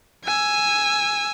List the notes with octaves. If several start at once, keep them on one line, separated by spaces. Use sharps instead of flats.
G#5 E6